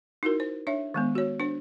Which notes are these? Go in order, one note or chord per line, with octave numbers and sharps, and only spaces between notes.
D#4 E4 F#4 A#4
C5
D4 C#5 E5
D#3 G#3 B3
F#4 C#5
D4 C5